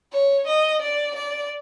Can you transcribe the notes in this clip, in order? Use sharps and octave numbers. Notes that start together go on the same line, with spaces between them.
C#5
D#5
D5
D5